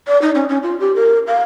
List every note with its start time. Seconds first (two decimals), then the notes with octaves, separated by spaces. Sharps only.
0.07 D5
0.22 D#4
0.35 C#4
0.49 C#4
0.63 F4
0.80 G4
0.95 A#4
1.27 F5